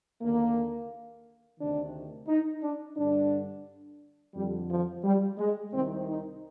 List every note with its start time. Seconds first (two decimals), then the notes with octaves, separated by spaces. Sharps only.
0.22 D#2 D3 A#3
1.59 D2 C3 D#3 D4
2.28 D#4
2.62 D4
2.97 G2 D3 D4
4.34 F2 D3 G3
4.69 F3
5.03 G3
5.38 G#3
5.72 C2 C3 D#3 C4
6.07 D#4